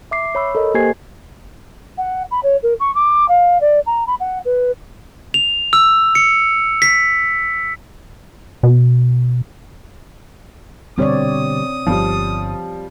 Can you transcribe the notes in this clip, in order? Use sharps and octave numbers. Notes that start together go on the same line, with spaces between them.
E5 D6 C7
C#5 B5 E6
A4 A#4 D#5
A#3 G4 C5 G#5 G#6 C7
F#5
B5
C#5
A#4
C#6
D6
F5
D5
A#5
B5
F#5
B4
F7
E6
C#7
B6
B2
B2 D3 G3 C4 C#5 D5 D#6
G1 F3 G3